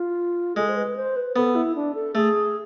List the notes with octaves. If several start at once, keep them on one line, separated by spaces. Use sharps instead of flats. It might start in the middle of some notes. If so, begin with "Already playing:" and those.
Already playing: F4
G#3 A4
C5
B4
C5
B4
B3 A4
E4
D4
A4
A3 G#4